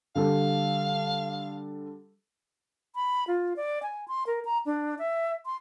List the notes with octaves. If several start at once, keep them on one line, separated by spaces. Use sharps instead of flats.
D3 G3 A4 F5
B5
F4
D5
G#5
C6
A#4
A#5
D4
E5
C6